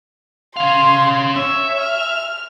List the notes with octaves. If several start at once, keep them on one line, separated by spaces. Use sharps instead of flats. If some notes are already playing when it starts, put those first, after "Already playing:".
C#4 F5 C6
C#5 E5
F6